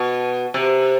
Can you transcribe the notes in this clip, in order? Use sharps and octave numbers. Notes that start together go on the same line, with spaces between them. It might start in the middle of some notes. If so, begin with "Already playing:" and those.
Already playing: B2
C3